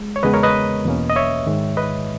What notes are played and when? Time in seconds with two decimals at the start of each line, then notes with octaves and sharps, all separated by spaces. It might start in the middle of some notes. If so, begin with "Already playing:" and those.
Already playing: G#3
0.16 C#5
0.23 E2 C#3 G#3 B3 B4 D#5
0.34 A#4 C#5
0.43 B4 D#5
0.85 E2 B2 A#3 C#4
1.10 D#5
1.16 C#5 E5
1.46 G#2 D#3 G#3
1.77 B4 D#5